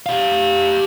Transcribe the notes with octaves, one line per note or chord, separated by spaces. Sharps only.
G4 F5